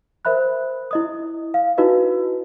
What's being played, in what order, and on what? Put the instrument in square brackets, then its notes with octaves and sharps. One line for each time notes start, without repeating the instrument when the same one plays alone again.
[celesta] A#4 C5 E5 B5 F#6
E4 D#5 D#6
F5
D#4 E4 F#4 B4 D#5